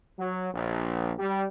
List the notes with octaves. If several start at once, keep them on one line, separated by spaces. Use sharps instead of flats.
F#3
A#1
G3